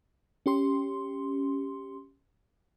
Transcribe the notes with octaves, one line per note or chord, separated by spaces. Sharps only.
C#4 G4 C6